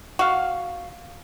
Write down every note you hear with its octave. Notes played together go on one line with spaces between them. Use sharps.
F#4 F5